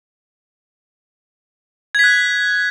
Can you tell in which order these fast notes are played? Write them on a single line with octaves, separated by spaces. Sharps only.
G#6 B6 F#6